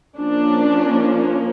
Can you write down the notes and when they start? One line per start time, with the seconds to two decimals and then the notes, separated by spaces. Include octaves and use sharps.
0.18 F3 A#3 C#4 D4